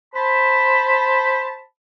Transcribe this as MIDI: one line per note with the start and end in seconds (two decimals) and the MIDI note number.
0.15 1.59 72
0.15 1.59 81
0.15 1.59 83